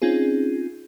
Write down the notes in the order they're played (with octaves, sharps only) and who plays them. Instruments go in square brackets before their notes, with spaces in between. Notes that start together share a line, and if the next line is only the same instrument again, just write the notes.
[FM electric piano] C4 C#4 D#4 F4 G#4